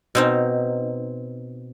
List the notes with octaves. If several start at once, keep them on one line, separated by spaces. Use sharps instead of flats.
B2 C4 D#4